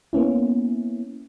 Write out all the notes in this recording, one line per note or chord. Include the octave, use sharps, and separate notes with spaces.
A#3 B3 C#4 E4